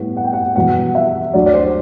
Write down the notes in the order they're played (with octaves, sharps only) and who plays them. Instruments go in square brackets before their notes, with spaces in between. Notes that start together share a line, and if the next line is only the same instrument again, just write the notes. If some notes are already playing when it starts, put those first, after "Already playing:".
Already playing: [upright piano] A2 G3 B3
F#5
G5
F#5
E2 B2 G3 B3 F#5
E5
D2 D3 F#3 D5
D5
C5